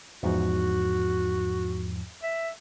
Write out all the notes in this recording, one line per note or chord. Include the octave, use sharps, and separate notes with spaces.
E2 G#2 F3 F#4
E5